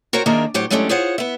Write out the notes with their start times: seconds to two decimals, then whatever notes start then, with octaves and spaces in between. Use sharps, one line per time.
0.13 F#4 A#4 C5 C#5 G5
0.26 D#3 A#3 D4 G#4 A#4 E5
0.54 A2 F#3 G4 C5 C#5
0.70 F#3 G#3 A3 C#4 D4 G4
0.89 F4 G#4 C5 C#5 F#5
1.18 B3 E5